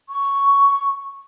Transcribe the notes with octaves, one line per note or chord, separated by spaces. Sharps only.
C#6